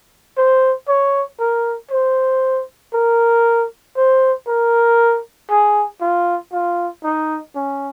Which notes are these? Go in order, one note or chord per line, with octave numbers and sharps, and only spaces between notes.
C5
C#5
A#4
C5
A#4
C5
A#4
G#4
F4
F4
D#4
C#4